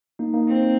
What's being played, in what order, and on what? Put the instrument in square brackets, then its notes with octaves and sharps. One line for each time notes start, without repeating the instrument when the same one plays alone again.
[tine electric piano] A#3 D#4
A#3 D#4
[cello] C4